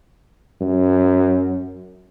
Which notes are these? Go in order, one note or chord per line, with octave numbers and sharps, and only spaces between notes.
F#2